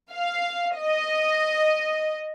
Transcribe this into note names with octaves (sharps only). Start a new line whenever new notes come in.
F5
D#5